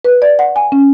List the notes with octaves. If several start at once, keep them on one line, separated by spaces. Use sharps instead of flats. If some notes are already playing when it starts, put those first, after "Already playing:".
B4
D5
F#5
G#5
C#4